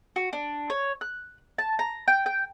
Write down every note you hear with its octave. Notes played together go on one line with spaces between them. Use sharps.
F#4
D4
C#5
F#6
A5
A#5
G5
G5